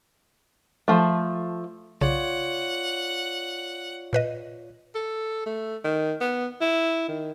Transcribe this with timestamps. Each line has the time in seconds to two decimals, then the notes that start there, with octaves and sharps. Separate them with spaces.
0.88 F3 A3
2.01 B1 C#3 F4 C#5 D5 F#5
4.13 A#2 B4 D#5
4.95 A4
5.46 A3
5.84 D#3
6.21 B3
6.61 E4
7.08 D#3